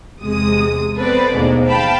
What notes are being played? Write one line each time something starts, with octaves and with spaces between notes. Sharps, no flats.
E2 C3 G#3 D#6
B3 C4 A4 B4 C5 D5
D#2 G#2 B2 A3 D4
F5 G5 A5 B5